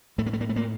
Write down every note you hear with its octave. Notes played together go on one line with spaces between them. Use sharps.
A2 A3
A#3
A3
A#3
A3
A#3